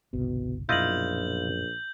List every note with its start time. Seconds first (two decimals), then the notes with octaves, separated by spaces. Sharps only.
0.13 G1 C2 B2
0.69 A#1 F#2 B2 E4 F4 D#5 G6 F#7